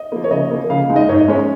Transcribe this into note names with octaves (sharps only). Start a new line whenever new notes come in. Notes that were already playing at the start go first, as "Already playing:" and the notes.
Already playing: D#5
F3 A#3
C#5
C#3 D#5
F3 A#3
C#3 F5
G#3 D#4
D#5
G#2 C#5
D#5
G#3 C#4 C#5